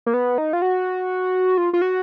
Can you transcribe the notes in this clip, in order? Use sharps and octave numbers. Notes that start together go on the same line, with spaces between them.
A#3
B3
D#4
F4
F#4
F4
F4
F#4